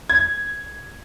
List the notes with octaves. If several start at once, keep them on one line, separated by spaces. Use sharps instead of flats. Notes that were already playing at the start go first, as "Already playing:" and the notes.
G#6